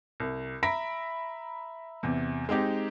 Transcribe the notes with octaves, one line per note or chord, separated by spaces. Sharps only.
C2
E5 A#5 B5 A#6 B6 D7
E2 C3
G#3 C4 D#4 G4